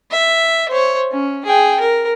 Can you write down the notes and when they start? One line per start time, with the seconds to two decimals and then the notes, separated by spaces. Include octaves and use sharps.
0.11 E5
0.68 C5 C#5
1.11 C#4
1.45 G#4 G5
1.80 A#4